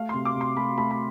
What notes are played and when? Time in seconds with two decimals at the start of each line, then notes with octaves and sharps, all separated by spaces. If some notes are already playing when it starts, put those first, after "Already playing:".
Already playing: A3 F5
0.09 C3 C6
0.25 D6
0.35 C3
0.41 C6
0.57 A3 B5
0.78 A3 B5
0.91 B5